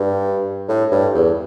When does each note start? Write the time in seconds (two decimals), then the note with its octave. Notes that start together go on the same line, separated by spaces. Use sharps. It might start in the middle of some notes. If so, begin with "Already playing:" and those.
Already playing: G2
0.69 A2
0.92 G2
1.15 E2